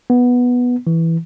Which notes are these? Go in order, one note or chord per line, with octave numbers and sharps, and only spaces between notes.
B3
E3